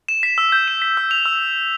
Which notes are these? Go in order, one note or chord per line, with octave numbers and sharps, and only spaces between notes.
E7
B6
E6
G6
E7
B6
E6
F7
E6